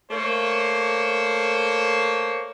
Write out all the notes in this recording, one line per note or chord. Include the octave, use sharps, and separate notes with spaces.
A3 A#3 C5 C#5